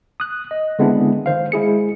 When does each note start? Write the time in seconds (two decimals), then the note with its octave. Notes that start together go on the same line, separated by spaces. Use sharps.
0.20 D#6 F#6
0.51 D#5
0.79 D3 G#3 B3 C4 D4 E4
1.26 D#3 C5 F5
1.52 G#3 E4 G#4 C#7